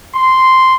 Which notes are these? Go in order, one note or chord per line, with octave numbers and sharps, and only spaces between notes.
C6